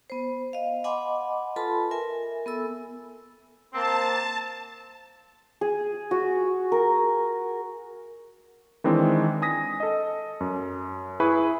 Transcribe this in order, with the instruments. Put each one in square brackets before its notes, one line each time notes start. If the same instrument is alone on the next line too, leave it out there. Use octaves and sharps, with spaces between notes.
[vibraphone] B3 C5
D#5 F5
D#5 F#5 G#5 B5 C6 D6
F4 A4 B4 A5 B5 C6
A#4 E5 G#5
B3 A4 E6
[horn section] A#3 C4 [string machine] A5
[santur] G#4
F#4
A#4
[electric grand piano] D#3 E3 G#3 C4 D4
G#5 D#6 A#6 B6
A4 D#5
F#2
E4 G#4 B4 B5 C#6